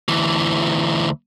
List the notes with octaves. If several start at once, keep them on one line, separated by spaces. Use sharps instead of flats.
D2 E3